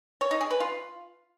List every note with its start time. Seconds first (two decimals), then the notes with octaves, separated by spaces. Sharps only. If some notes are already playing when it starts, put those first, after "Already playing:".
0.21 C#5
0.31 D#4
0.41 G#4
0.50 B4
0.60 F4